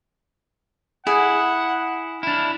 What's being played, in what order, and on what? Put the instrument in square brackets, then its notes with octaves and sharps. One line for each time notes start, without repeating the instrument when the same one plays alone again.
[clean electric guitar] E4 [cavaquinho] G#4 [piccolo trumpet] F#5
[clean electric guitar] D4 E4 [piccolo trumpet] F6